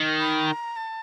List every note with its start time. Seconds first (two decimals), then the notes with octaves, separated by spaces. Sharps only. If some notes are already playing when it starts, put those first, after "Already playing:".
Already playing: D#3
0.20 B5
0.47 A#5
0.76 A5